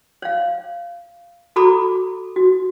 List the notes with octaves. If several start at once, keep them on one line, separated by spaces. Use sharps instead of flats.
C#5 F5
F#4 A4 A#5 B5 D6
F#4